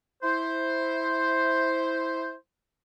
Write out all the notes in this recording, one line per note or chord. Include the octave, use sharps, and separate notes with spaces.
E4 C5